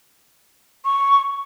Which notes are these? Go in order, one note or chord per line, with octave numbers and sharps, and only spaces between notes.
C#6